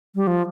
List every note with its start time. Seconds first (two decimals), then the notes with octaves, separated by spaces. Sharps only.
0.15 G3
0.27 F3